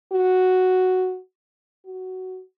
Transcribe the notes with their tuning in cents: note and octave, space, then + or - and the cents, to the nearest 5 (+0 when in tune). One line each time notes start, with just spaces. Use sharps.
F#4 +0
F#4 +10